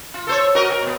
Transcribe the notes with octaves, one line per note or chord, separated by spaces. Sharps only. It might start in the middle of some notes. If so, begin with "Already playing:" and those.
F4
A4 C5 C#5
F#4 A#4 D#5
C3 A#4
B2 B3